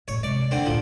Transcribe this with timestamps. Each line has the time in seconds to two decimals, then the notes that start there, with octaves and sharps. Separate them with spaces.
0.08 A1 A2 C#5
0.23 C3 G#3 D5
0.51 D#2 D3 C4
0.66 D2 A2 F3